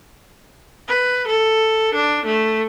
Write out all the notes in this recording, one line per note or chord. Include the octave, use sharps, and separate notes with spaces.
B4
A4
D4
A3